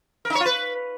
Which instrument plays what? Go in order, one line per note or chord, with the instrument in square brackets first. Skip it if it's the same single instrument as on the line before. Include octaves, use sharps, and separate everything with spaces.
[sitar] A#4
D#4
C#5
F4
B4